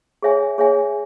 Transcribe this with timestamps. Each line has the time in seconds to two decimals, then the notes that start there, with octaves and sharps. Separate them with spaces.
0.22 G#4 C#5 E5 G#5
0.58 G#4 C#5 E5 G#5